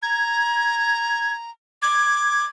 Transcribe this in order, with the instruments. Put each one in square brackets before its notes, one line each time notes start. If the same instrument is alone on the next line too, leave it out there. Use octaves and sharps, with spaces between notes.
[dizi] A#5 [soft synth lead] G#6
[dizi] D6 [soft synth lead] G#6